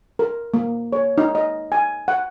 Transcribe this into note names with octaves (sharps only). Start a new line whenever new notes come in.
A#4
A#3
C#5
D#4
D#5
G#5
F#5